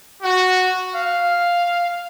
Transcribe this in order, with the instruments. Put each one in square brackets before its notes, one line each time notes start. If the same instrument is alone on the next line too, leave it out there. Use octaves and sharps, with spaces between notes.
[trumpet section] F#4
F5